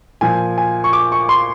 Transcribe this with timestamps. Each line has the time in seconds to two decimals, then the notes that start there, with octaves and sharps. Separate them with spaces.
0.21 A#2 F3 G#5
0.58 G#5
0.84 C#6
0.93 D6
1.12 C#6
1.29 C6